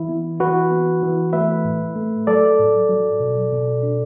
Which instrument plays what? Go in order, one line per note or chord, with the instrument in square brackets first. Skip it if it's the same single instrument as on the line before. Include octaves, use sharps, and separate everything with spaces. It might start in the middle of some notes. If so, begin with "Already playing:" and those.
Already playing: [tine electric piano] E3 E4
B3
E3 F#4 B4
B3
E3
A3 B4 E5
A2
A3
F#3 A4 D5
A2
F#3
B2
B2
D4